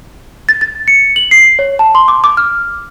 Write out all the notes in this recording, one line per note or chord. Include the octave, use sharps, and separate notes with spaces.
A6
A6
C#7
F#7
C7
C#5
A5
C6
D6
D6
F6